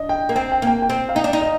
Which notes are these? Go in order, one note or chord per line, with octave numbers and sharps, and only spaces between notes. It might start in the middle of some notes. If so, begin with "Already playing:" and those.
Already playing: D4 D#5
G5
A#3
C4 G5
G5
A#3 G5
G5
C4
F5
D#4 G5
D4
D#4
D#5